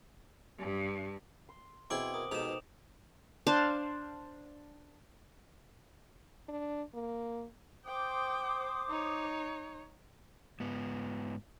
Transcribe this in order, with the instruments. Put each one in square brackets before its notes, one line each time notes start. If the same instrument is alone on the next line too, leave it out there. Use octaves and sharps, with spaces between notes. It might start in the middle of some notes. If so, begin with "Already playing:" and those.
[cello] G2
[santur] C6
[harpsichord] B2 E4 G#4 [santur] C4 F#5 [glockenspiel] D6 D7 F#7
[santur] A#4 [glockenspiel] D#6
[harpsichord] G#2 B2 G4 [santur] D#4 A4 [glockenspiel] E7 F7
[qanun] D4 C5 F5
[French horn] D4
A#3
[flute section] C5 D6 D#6 [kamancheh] G5
[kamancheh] D#4 C#5
[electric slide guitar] G#2 B3